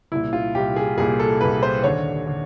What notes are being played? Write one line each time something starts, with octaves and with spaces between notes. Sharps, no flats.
C2 A#2 E4
F4
C2 A#2 G4
G#4
C2 A#2 G#4
A4
C2 A#2 B4
C5
D#2 D3 C#5
D3